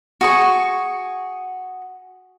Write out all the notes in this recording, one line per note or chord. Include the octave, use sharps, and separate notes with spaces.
F#4 G#4 C#6